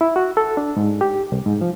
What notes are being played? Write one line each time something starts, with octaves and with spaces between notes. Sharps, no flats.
E4
F#4
A4
D4
G#2
G4
C2
G#2
F3